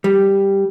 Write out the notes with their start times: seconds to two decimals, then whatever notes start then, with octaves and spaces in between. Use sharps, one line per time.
0.04 G3